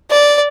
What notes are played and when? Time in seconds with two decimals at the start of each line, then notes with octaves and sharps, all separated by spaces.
0.11 D5